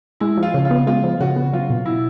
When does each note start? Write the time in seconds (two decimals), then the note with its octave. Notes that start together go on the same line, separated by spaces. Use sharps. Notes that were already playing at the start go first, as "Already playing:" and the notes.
0.20 G#3 E4
0.37 F3
0.43 F4
0.54 C#3
0.65 F4
0.71 B3
0.87 G#3 F4
1.04 F3
1.20 C#3 F#4
1.36 B3
1.53 F#3 F4
1.70 B2
1.86 E4